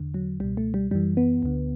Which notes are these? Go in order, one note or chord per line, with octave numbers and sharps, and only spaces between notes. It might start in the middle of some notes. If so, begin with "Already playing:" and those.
Already playing: E2 D3
F#3
C#2 B2 G3
A3
G3
F#2 E3 G3
B3
D2 D3